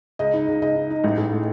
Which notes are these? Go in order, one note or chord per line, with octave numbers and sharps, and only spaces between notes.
C#2 D#5
D#4
C#2
C#2 D#5
D#4
D#4
A1
A1
A2